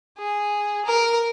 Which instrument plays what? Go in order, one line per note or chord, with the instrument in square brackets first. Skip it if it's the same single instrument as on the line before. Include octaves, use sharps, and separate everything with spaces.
[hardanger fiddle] G#4
A#4